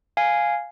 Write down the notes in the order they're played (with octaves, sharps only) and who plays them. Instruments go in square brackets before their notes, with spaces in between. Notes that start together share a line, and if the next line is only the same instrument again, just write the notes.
[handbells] F5 G#5